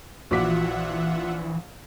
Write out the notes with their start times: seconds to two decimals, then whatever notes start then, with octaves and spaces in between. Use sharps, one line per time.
0.31 A#1 E3 F4 F#4 E5 F#5 D6 B6